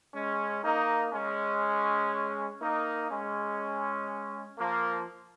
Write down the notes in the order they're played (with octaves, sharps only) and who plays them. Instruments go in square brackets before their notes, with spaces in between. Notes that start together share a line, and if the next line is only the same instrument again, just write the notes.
[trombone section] G#3 C#4
A#3 D#4
G#3 C#4
A#3 D#4
G#3 C#4
F3 A#3